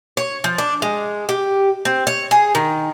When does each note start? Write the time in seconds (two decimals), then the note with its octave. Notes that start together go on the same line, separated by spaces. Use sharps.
0.17 C#5
0.44 F3
0.58 D4
0.82 G#3
1.29 G4
1.85 C4
2.07 C#5
2.31 G#4
2.55 D#3